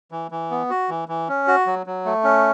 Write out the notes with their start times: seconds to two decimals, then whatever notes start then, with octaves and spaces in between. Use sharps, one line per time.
0.11 E3
0.31 E3
0.51 B3
0.70 F#4
0.89 E3
1.08 E3
1.28 C#4
1.47 F#4
1.66 F#3
1.86 F#3
2.05 A3
2.24 C#4